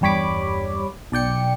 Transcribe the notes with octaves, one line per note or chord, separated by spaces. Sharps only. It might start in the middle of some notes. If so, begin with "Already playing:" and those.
E2 G2 G3 C#5 B5 D6
B1 D5 G5 C#7